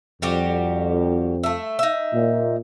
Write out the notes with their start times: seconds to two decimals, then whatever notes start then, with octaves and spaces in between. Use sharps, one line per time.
0.22 F2 G3 F#4 G4
1.43 A3 E5
1.79 D#4 E5
2.13 A#2